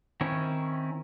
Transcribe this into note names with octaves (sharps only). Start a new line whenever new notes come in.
D#3 C4 C#4 E4 C#5